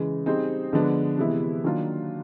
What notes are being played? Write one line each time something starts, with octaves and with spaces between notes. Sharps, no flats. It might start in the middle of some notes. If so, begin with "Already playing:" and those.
Already playing: C#3 E3 G#3
G3 C4 D#4 G#4 C5
D3 F3 G#3 B3 D4
C3 E3 G#3 B3 E4
D#3 F#3 A#3 D4 F4